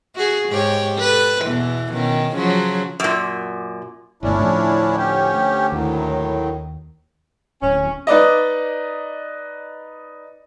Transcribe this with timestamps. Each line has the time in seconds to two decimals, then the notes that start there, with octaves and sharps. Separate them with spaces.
0.16 F#4 G#4
0.49 G#2 G4 C#5
0.98 A4 B4
1.41 E2 B2 E3
1.93 B2 D#3 C#4
2.33 C#3 F3 F#3
3.00 F#2 A#2
4.23 G1 D2 C#4 D4 E4
4.39 D2 A2 F3
4.96 C#4 G4
5.72 D#2 A2 D#3 F#3
7.62 D1 C#4
8.07 D#4 B4 D5 D#5